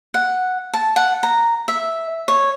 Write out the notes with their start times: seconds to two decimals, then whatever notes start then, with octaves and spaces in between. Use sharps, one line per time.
0.14 F#5
0.74 A5
0.96 F#5
1.23 A#5
1.68 E5
2.28 C#5